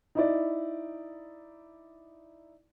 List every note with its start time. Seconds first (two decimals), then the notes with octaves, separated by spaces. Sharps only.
0.15 D#4 E4 D5